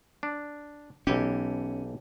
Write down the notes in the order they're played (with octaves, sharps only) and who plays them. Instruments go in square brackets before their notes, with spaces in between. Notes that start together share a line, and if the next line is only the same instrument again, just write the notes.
[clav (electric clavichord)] D4
[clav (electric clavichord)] B1 E3 G4 [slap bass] C#4